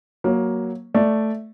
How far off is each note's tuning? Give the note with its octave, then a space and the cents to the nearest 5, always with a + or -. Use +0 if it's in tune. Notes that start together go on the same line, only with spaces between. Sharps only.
F#3 +0 A#3 +10
A3 +0 D5 +0